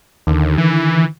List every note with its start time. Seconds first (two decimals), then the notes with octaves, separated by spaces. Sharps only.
0.27 D#2 D3 D#3
0.58 E3